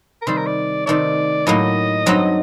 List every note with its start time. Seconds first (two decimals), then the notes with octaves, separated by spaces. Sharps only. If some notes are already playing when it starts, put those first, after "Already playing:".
0.22 A#4
0.27 C3 D#3 G3 C5
0.37 A#4
0.47 D5
0.86 C3 D#3 A3 D5
1.46 A2 F#3 A#3 D#4 D#5
2.06 G2 F#3 C4 D#4